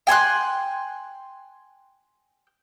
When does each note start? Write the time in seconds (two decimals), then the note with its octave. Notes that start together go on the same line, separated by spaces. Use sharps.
0.07 G5 G#5 C6 F#6